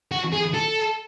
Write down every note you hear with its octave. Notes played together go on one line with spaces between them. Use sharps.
F#4
G#4
A4